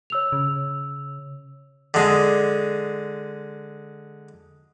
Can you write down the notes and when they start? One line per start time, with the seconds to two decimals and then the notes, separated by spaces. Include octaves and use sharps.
0.10 C#5 E6 F7
0.32 C#3
1.94 D3 G#3